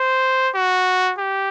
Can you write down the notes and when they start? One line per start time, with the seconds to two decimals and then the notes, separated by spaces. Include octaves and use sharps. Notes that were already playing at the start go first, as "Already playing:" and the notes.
Already playing: C5
0.55 F#4
1.19 G4